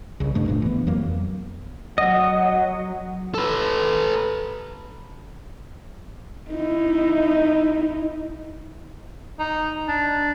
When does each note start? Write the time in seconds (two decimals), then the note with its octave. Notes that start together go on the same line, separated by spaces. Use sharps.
0.20 C2 C#3
0.34 G2 A3 D4
0.48 F#1 A#2 A3 D4
0.62 E3 B3
0.87 F2 F#3 A#3
1.98 F#3 D#5 F#5
3.34 A4 B4
6.50 D#4 E4
9.39 D#4
9.88 D4